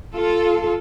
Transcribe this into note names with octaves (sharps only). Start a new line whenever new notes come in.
F4 A4